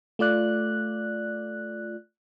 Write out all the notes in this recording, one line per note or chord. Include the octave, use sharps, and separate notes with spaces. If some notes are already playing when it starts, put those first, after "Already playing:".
A3 F4 D5 F#6